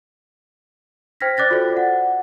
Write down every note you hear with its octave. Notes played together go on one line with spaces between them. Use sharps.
C5 G5 F6 G#6 A#6 B6
C5 D5 D6 F#6 A6 A#6
F4 F#4 A4 C5 D5
F#5